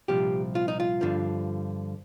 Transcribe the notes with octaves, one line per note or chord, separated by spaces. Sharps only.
C2 A#2 F3 G4
F4
D#4
F4
G2 D3 F3